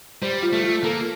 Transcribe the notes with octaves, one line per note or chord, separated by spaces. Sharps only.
G3 C5
F4
A3
F4
A#3 A4